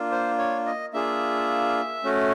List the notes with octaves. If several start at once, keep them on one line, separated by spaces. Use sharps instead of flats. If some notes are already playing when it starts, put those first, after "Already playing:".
Already playing: A#3 D4 F4
C5
C#5
D#5
A#3 D4 F4 G#4 E5
A3 C#4 F#4